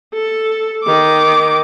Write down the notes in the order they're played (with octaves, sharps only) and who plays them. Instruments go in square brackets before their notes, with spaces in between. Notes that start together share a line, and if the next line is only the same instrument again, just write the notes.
[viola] A4
D#3 D6